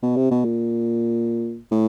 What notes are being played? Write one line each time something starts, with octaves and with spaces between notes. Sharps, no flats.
B2
C3
B2
A#2
A2